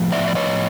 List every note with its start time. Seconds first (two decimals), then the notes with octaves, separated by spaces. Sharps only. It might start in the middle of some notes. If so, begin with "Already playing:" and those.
Already playing: A2 F3
0.12 D5 E5
0.27 D5
0.35 C#5 D#5